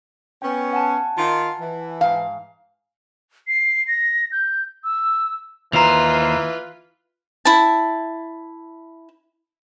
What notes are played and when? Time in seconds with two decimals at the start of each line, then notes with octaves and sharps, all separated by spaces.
0.42 B3 C#4 G5
0.73 F#5 G#5 A5
1.17 D#3 F4
1.60 E3
2.01 G#2 F5
3.48 C7
3.88 A#6
4.32 G6
4.84 E6
5.73 D#2 E3 F4 B4 C5 A#5 F7
7.45 E4 A5